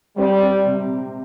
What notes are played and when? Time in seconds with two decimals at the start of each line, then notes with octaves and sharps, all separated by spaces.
0.17 G3 C4
0.42 C4
0.66 C3